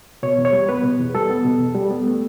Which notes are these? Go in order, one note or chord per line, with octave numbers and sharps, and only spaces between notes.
B2 C#5
E2
C#5
G3
B3 B4
B2
E2
G3 A4
B3
B2
E2
G3
B3
A3